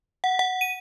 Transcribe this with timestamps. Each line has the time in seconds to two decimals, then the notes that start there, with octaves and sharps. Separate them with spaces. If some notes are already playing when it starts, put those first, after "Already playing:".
0.24 F#5
0.39 F#5
0.61 D#7